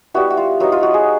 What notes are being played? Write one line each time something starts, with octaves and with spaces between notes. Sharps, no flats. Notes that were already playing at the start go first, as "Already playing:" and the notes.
G3 B3 E4 F#4
F#4
F4
F#3 B3 D#4 F#4
F4
F#4
G#4